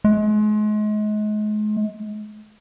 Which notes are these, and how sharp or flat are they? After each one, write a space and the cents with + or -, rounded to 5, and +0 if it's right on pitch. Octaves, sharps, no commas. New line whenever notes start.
G#3 +35